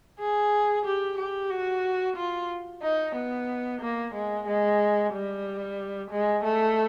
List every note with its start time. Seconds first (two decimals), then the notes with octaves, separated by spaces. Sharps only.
0.20 G#4
0.85 G4
1.18 G4
1.50 F#4
2.16 F4
2.83 D#4
3.16 B3
3.81 A#3
4.14 G#3
4.47 G#3
5.13 G3
6.11 G#3
6.44 A3